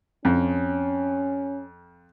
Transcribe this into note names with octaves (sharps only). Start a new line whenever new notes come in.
F2 C#4